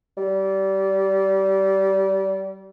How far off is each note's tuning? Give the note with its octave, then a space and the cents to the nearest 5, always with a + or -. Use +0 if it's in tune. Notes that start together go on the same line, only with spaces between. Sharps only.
G3 -25